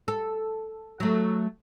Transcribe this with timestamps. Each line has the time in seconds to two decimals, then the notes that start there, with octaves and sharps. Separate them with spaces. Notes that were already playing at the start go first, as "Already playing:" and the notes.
0.08 A4
1.00 F#3 A3